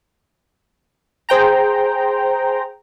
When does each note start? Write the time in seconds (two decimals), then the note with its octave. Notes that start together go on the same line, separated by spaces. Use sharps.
1.29 G#4 C5 G5 A#5